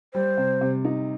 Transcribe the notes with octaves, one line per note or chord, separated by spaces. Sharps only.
G3 C5
C3
C3
D#4